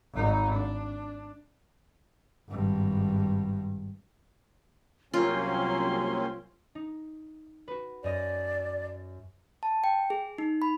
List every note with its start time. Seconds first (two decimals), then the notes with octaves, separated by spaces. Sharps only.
0.14 G#1 D#4
0.53 D4
2.49 G#1 G2
5.14 C2 F#3 A#3 C4 C#4 F4 C6
6.75 D#4
7.68 F#4 B4
8.04 F#2 D5 D#5 A#6
9.63 A5
9.84 G5
10.10 G#4
10.38 D#4
10.62 B5